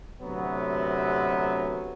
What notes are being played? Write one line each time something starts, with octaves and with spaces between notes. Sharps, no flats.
D2 C3 F#3 B3